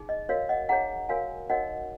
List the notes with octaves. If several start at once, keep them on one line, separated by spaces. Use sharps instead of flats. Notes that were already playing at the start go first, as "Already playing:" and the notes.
Already playing: D#4 G#4
D#5
F#4 A#4 C#5 F5
D#5 F#5
D#4 G#4 C#5 F#5 A#5
F#4 A#4 C#5 F5 G#5
D#4 F#4 A#4 C#5 D#5 F#5